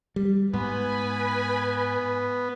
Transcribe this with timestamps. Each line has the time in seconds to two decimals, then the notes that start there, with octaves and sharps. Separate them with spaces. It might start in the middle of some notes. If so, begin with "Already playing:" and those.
0.16 G3
0.53 G#2 B3 B4 G#5 B5